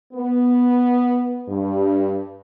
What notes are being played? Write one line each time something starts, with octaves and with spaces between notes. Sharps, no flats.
B3
G2